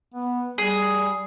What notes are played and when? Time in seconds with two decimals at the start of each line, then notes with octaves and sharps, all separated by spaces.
0.14 B3
0.58 G3 G#4